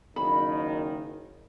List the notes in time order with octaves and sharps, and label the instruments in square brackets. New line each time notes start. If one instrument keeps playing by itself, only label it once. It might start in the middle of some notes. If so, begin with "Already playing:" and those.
[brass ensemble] F#1 D#3 [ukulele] B5